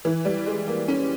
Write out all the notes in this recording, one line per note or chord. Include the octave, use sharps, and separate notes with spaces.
E3
G3
G#3
A#3
C#4